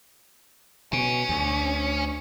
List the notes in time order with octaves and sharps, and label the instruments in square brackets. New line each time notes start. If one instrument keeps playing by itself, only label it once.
[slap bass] B2 [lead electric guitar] C#4
[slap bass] D2